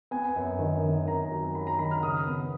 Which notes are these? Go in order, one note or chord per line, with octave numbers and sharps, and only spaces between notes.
B3 G#5
F#2
D#3
D#3
F#2 A#5
F#3
F#3 B5
A#5
D#3 B5
F6
C#3 D#6
B3